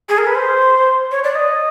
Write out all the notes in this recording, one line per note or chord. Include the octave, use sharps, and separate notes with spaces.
G#4
A#4
B4
C5
C#5
D5
D#5